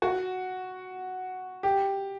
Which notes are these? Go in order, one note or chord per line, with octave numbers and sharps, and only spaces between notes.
F#4
G4